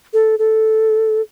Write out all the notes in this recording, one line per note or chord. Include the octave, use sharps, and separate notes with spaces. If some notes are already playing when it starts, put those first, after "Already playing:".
A4
A4